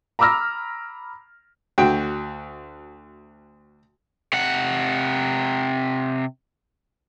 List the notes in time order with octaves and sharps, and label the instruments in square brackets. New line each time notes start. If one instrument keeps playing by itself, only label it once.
[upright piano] A#5 B5 D6 E6 F6 A#6
[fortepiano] D2 F#4 G5
[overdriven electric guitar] C3 F#5